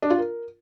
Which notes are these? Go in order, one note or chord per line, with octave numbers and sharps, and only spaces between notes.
D4
F4
A#4